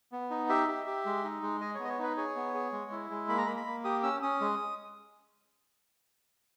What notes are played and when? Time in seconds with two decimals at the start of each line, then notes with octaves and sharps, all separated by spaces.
0.12 B3
0.30 D#4
0.49 G4 E5
0.68 G4
0.87 G4
1.05 G#3
1.24 D#4
1.43 G#3
1.61 G#4 D#5
1.75 B3 C#5
1.85 D#5
1.89 C#5
1.99 D#4 B4
2.17 G#4 C#5
2.36 B3
2.54 G#4
2.72 G#3
2.92 E4
3.10 G#3
3.29 A#3 B5
3.38 A#5
3.47 A#3 B5
3.57 B5
3.66 A#3
3.85 G4 D#6
4.03 C#4 E6
4.22 C#4 D#6
4.41 G#3